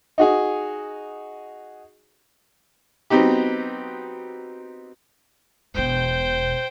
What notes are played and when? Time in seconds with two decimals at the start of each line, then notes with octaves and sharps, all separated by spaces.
0.18 D#4 F#4 G#4
3.10 F#3 B3 C4 D#4 G4
5.74 E1 B2 C5 G5